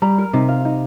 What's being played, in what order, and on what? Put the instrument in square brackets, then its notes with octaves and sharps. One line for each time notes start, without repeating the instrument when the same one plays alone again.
[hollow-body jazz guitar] G3 [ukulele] A#5
[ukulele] A#4
[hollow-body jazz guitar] C3 [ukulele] D#4
[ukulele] F5
D#4